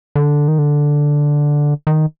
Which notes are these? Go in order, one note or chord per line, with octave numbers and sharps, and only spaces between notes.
D3
D#3
D3
D#3